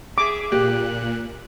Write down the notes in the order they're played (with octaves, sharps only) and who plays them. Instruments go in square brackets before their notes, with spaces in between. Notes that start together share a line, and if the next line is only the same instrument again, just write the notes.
[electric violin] G#4 E5 [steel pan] D6
[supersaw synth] A#2 [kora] G4 [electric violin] F#6